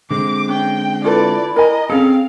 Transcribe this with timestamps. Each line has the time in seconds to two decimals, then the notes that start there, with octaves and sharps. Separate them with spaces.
0.11 D3 G#3 C4 D6
0.49 C#4 G5
1.04 E4 F4 A4 B4 D5
1.56 A#4 D#5 G#5 A#5
1.90 C4 C#4 G#4 A4 F5